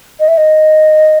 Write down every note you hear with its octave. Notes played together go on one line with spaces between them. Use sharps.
D#5
E5
D#5